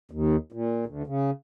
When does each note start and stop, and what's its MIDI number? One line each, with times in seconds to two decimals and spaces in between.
0.11 0.36 39
0.52 0.85 46
0.86 1.03 38
1.07 1.31 49